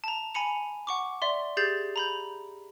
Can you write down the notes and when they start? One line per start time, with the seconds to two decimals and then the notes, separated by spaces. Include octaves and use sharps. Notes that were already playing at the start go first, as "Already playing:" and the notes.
0.04 A5 A#5
0.34 G#5 B5 C#7 F7
0.87 F#5 C#6 D6
1.22 D5 E5 C6
1.57 G4 G#4 G6 A6 C7
1.96 A#5 B5 G6